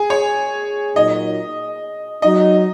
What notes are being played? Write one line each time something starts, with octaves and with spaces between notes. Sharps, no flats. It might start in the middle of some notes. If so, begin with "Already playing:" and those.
Already playing: G#4
C#5
A#2 F#3 D#4 D#5
F#3 D#4 D#5